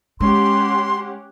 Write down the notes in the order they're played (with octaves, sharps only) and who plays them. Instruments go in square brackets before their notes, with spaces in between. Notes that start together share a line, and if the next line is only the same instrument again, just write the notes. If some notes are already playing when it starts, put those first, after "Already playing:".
[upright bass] G#3 [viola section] C#4 G4 F#5 [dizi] C6